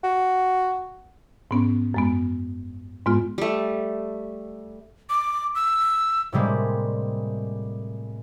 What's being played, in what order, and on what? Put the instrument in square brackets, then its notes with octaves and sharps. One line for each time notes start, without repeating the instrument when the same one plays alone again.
[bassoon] F#4
[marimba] G#2 B3 C#4
F#2 G#3 B3
G#2 G#3 B3 F4
[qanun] G3 A3
[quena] D6
E6
[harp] A2 C3 G3 G#3 A#3